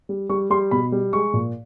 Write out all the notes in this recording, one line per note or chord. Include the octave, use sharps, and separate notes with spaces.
G3
G3 C#6
G3 C6
B2 B5
G3
G#3 C#6
A#2